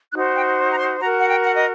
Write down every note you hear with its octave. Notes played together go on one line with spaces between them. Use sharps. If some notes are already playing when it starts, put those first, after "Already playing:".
D#4 F#4 C5 F#6
G5
A#5
C6
F#4 A#4 A#5
F#5
G5
F#5
D#5